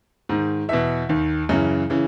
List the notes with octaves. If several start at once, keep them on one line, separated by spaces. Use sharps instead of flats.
G#2 D#3
E2 B2 E5
D#2 D#3
F#2 C#3 E3
C#3 E3